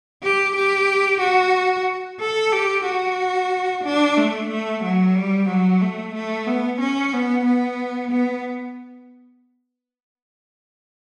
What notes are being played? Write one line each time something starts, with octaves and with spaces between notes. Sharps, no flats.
G4
G4
F#4
A4
G4
F#4
D4
A3
A3
F#3
G3
F#3
A3
A3
B3
C#4
B3
B3
B3